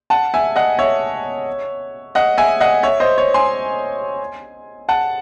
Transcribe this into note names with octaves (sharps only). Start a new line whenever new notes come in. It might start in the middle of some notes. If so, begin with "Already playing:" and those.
F#5 A5
E5 G#5
D#5 F#5
C#5 E5
D#5 F#5
E5 G#5
D#5 F#5
C#5 E5
C5 D#5
C#5
G#5 C6
F#5 A5